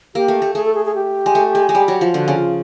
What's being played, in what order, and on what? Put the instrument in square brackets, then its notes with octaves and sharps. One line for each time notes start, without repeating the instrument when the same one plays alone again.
[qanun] A#3 [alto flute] G4
[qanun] A3
A3
[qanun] A3 [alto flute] G#4
[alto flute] A4
G#4
G#4
G4
[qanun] G#3
A3
G#3
G#3
G3
F#3
F3
[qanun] D3 [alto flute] F#4
[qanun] C#3
[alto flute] F4